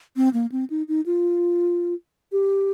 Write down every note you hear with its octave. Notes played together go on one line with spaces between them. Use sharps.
C4
A#3
C4
D#4
D#4
F4
G4